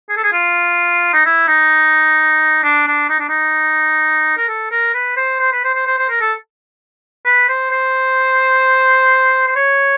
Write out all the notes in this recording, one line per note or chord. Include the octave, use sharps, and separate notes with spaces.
G#4
A4
G#4
F4
D#4
E4
D#4
D4
D4
D#4
D4
D#4
A#4
A4
A#4
B4
C5
C5
B4
C5
C5
C5
C5
A#4
A4
B4
C5
C5
C5
C#5